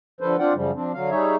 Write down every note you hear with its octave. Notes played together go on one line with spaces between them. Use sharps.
D3 F3 A4 B4 C5
C4 D4 F4 D5 F#5 G5
F#2 C#3 F3 G3
F3 C4 D4
D3 F#3 F5
G3 D#4 G#4 C#5 E5